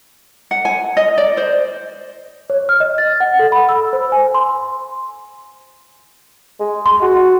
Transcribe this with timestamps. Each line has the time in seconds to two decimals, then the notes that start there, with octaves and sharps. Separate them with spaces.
0.51 F#5
0.65 G#5
0.97 D#5
1.18 D5
1.37 C5
2.50 C#5
2.69 F6
2.80 D#5
2.98 A6
3.20 F#5
3.39 A4
3.52 B5
3.69 E6
3.93 C5
4.12 G#5
4.34 C6
6.60 G#3
6.86 C6
7.02 F#4